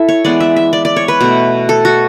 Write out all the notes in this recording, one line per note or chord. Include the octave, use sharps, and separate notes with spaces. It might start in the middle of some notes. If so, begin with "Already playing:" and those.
Already playing: E4 A4 E5
C#5
E3 G#3 B3 D5
E5
E5
D5
D5
C#5
B4
B2 A3
A4
F#4